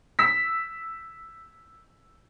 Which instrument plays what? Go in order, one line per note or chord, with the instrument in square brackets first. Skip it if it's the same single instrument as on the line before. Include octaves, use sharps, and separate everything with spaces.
[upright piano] E6 B6